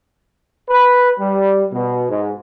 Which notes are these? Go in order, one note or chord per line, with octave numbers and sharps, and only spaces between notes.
B4
G3
B2
G#2